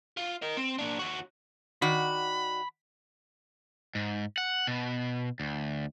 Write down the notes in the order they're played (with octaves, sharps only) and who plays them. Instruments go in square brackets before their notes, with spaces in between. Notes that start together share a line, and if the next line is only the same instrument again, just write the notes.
[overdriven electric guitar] F4
A#4 D#5
C4
A#3 D4
D#2 F#4
[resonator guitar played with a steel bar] D#3 F#4 D5 [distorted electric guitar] B5
[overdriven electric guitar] G#2
F#5
B2
D2